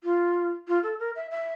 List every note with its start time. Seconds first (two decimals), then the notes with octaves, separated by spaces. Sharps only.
0.04 F4
0.68 F4
0.83 A4
0.99 A#4
1.16 E5
1.31 E5